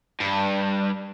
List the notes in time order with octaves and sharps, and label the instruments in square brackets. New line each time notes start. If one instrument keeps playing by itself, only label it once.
[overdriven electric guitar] G2